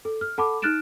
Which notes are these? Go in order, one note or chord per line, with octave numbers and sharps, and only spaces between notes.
A4
F6
A4 F#5 A5 B5 D6
D#4 F6 F#6 A6 D7 E7